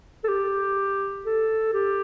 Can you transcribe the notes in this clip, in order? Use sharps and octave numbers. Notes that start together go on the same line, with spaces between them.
A4
G4
A4
G4